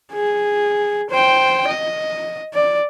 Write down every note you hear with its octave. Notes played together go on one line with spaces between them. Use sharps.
G#4
C5 G5
D#5
D5